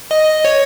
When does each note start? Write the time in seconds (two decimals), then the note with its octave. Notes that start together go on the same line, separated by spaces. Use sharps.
0.11 D#5
0.45 C#5